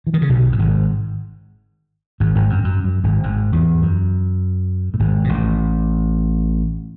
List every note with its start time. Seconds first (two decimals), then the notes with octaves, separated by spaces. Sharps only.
0.07 E3
0.14 D#3
0.22 C#3
0.29 B1 B2
0.52 A2
0.59 G#1 G#2
2.20 G#1 G#2
2.35 G#1 G#2
2.50 F#2
2.64 F#2
2.84 F#2
3.04 G#1 G#2
3.23 G#1 G#2
3.53 E2
3.82 F#2
4.94 A2
4.99 G#1 G#2
5.24 B2
5.29 A1 A2